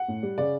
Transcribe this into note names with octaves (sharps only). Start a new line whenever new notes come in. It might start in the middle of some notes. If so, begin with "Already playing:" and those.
Already playing: F#5
A2
G3
C#3 D5